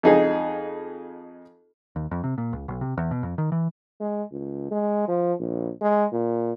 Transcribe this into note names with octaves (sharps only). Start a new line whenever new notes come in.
F2 D#4 G#4
D#2
F2
C3
A#2
C#2
B1
C3
E2
B2
F2
D#3
E3
G#3
C#2
G#3
F3
A#1
G#3
A#2